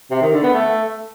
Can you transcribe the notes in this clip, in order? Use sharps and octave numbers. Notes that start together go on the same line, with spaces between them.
C3
D#3
D3
B3
A3